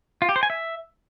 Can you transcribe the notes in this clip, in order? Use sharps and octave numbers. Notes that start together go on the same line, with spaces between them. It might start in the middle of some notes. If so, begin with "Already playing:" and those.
F4
G4
C5
G#5
E5